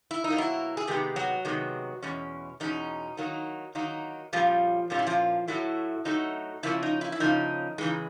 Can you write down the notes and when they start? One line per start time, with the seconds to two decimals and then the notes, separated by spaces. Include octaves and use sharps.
0.11 E4
0.24 D#4
0.30 B2 F#3 A#3
0.38 E4
0.77 G#4
0.87 C3 D#3 G#3 B3 G4
1.16 F#3 F#4
1.45 C3 D#3 G#3 B3
2.02 E2 B2 G#3 C#4
2.60 E2 B2 G#3 C#4 D#4
3.17 D#3 F#3 A#3 D#4
3.75 D#3 F#3 A#3 D#4
4.33 A#2 F3 G3 A#3 C#4 F4
4.90 A#2 G3 A#3 C#4 F4
4.99 E4
5.07 F3 F4
5.48 A2 F#3 A3 E4
6.05 A2 F#3 A3 D#4
6.63 C#3 F3 A#3 C#4 E4
6.83 D#4
7.01 E4
7.12 E4
7.20 C#3 F3 A#3 C#4 D#4
7.78 C#3 E3 G#3 D#4